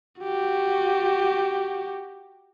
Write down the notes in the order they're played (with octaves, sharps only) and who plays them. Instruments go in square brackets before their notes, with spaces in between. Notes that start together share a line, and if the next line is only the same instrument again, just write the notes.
[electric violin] F#4 G4